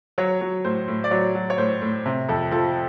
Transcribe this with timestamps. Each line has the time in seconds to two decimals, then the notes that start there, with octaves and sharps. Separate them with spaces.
0.18 F#3 C#5
0.41 F#3
0.65 A2 C5
0.88 A2
1.04 D5
1.11 F#3 C#5
1.35 F#3
1.50 C#5
1.58 A2 C5
1.82 A2
2.06 C3
2.29 F2 A4
2.51 F3 A4